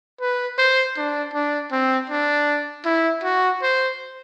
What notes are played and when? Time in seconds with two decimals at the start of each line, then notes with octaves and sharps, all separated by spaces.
0.21 B4
0.58 C5
0.97 D4
1.34 D4
1.72 C4
2.10 D4
2.85 E4
3.23 F#4
3.62 C5